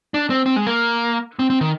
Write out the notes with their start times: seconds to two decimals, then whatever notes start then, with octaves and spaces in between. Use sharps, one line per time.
0.14 D4
0.30 C4
0.46 C4
0.56 G#3
0.67 A#3
1.39 C4
1.50 C4
1.61 D#3